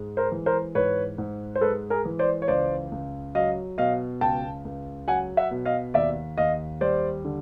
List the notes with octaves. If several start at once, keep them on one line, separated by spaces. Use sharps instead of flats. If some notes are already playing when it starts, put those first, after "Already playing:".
Already playing: G#2 G#3
A#4 C5
E3
A#4 C5
G#2 B4 C#5
G#2
C5
G#3 A4 B4
G#4 A#4
E3
C5 D5
C#5
C#2 C5 D5
C#2
F#3 D#5 F5
B2 D#5 F5
C#2 G5 A5
C#2
F#3 F#5 G#5
E5 F#5
B2
D#5 F5
D#2 D5 E5
D#2 D#5 F5
G3 C5 D5
D3